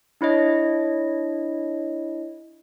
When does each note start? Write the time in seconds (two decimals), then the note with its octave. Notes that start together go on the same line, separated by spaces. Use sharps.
0.21 D4 E4 C#5 D#5